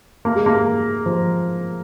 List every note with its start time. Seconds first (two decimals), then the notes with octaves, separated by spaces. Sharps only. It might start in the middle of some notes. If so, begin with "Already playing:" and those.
0.25 A#3
0.35 G#3
0.46 A#3
1.06 F3